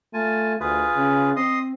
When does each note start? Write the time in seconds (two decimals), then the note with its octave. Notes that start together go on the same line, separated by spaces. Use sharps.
0.14 A3 F4 G#5 A5
0.60 D2 F4 G#4 B4
0.96 C#3
1.36 C4 D#5 C6 D#6